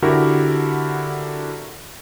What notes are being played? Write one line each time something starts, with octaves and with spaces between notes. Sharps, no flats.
D3 E4 F#4 G4 A#4